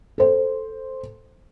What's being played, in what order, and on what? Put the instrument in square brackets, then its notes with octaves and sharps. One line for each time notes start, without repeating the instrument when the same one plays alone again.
[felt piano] A4 C5